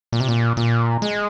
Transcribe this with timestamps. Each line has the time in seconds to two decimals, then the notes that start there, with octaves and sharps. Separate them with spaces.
0.12 A#2
0.20 C3
0.29 A#2
0.57 A#2
1.02 G#3